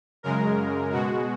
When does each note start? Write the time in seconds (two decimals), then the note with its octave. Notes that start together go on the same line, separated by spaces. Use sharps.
0.23 F#2 C#3 G#3 A#4
0.92 B2 G#3 F#4